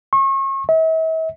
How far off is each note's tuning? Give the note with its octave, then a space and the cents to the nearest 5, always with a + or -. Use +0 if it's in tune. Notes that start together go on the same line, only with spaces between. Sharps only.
C#6 -35
E5 -45